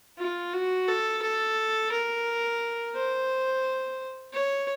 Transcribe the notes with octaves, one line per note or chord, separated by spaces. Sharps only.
F4
F#4
A4
A4
A#4
C5
C#5